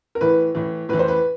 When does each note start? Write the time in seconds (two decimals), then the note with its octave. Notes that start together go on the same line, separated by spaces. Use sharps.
0.15 A#4
0.21 A2 E3 B4
0.55 A2 E3
0.89 A2 E3 B4
0.99 C5
1.08 B4